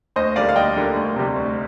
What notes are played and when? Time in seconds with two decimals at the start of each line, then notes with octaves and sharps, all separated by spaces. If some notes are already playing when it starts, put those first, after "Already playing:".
0.16 D2 C5 D#5
0.36 D3 G3 A#3 D5 F5
0.49 F5
0.55 D2 D#5 G5
0.77 D3 G3 A#3
0.96 D2
1.16 C3 G3
1.36 D2